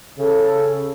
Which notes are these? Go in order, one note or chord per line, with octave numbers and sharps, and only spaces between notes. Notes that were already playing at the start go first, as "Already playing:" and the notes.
C#3 A4